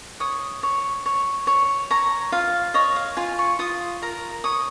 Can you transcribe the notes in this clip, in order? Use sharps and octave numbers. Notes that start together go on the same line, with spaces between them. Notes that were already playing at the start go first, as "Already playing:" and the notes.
C#5 D#6
C#5
C#5
C#5
C#5 A#5
F4 F5
C#5 D#5
F5
F4 G#5
C#6
F4 D#6
A#4 A#5
C#5 D#6